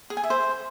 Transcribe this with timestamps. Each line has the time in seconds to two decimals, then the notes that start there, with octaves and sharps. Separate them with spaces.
0.10 G#4
0.17 G#5
0.24 E5
0.30 C5